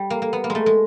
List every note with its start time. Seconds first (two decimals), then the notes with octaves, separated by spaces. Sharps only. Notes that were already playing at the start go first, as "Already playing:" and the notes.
Already playing: G3
0.10 A#3
0.22 A#3
0.33 B3
0.44 A#3
0.50 G#3
0.55 A3
0.66 G#3